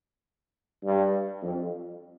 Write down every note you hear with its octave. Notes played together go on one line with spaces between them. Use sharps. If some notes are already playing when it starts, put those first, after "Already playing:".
G2
F2